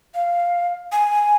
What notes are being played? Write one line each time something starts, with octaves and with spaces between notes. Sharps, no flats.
F5
G#5